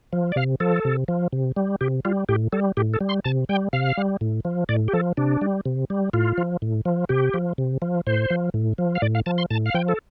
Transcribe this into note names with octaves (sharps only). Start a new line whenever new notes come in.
F3
D5
C3 F5
F3 A4
C3
F3
C3
G3
C3 G4
G3 F4
A2 G4
G3 A4
A2 G4
A4
G3
C6
C3 A5
G3 G5
C3 F5
G3
A2
F3
A2 D5
G4
F3 A4
C3 D4
G3
C3
G3
A2 F4
F3
A2
F3
C3 G4
F3
C3
F3
A2 C5
F3
A2
F3
F5
A2 D5
F5
F3 A5
C6
A2 A5
F5
F3 G5
A4